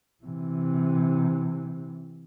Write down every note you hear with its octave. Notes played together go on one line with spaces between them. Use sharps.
C3 E3